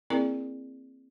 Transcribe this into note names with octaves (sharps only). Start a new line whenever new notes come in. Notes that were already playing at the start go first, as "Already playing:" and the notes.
A#3 C4 E4 G#4 A#4 D5